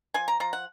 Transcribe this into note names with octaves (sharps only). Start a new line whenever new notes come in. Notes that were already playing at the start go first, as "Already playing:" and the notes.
F3 G#5
A#5
F3 A#5
F#5